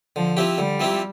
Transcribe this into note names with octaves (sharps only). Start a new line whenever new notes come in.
D3 F3
F3 C4 E4 G4
D3 G3
F3 C4 E4 G4